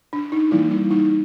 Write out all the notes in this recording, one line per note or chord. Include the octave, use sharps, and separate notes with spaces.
D4
D#4
E3 G3 A#3 E4
E4
D#4